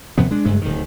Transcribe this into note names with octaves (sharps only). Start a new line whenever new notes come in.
D#2 C3 F3 B3
G#3 D4
F#1 G2 G#3 A3
D1 D#3